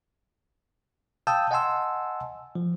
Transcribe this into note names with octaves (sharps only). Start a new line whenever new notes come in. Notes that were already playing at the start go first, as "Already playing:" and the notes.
F5 G5 A5 D#6 E6 G6
D#5 F#5 G#5 A5 C6 E6
F3